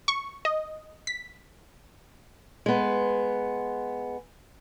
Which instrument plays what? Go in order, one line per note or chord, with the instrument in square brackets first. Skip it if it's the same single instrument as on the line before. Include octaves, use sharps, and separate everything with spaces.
[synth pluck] C#6
D#5
B6
[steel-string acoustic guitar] G#3 B3